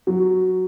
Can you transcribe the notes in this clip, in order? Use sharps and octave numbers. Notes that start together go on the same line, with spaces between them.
F#3